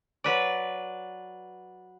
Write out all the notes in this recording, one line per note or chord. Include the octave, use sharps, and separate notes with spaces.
F#3 B4 D5